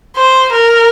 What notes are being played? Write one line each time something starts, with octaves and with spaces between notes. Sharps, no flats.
C5
A#4